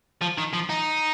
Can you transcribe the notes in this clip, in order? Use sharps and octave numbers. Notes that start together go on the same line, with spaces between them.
F3
D#3
F3
D#4